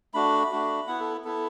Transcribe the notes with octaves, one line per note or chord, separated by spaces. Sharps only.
A3 D4 F#4 B5
A3 D4 F#4
B3 E4 F#5
A4
B3 E4 A4